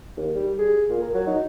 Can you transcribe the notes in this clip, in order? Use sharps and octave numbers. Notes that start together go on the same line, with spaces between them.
D#2
G3
G#4
A#2
A#4
F#3
D#4